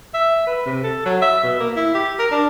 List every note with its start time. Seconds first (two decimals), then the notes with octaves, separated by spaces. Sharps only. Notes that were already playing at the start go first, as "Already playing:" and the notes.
0.14 E5
0.46 B4
0.66 C3
0.83 A4
1.05 F#3
1.22 E5
1.43 B2
1.60 A#3
1.76 E4
1.94 G4
2.19 A#4
2.31 D4